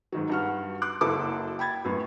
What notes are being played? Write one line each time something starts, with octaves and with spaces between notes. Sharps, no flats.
G#2 D#3 F#3
G2 F#4 F6
C6 D6 F#6
F#1 F#3 E4 A4 D6
G5 B5 G#6 A6
F#2 A2 B3